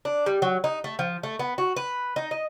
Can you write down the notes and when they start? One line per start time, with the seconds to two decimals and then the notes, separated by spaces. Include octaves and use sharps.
0.05 D4
0.26 G3
0.42 F#3
0.64 D#4
0.84 A3
0.99 F3
1.23 A3
1.39 B3
1.58 F#4
1.76 B4
2.16 D#4
2.31 D#5